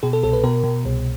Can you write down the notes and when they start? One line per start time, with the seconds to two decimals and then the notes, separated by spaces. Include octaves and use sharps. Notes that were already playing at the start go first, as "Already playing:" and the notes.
0.03 B2 G#4
0.13 A4
0.23 C2 A4
0.33 B4
0.44 B2 A#4
0.64 B2
0.85 C2